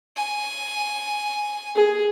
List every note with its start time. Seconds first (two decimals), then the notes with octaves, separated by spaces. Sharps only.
0.17 G#5
1.76 G#4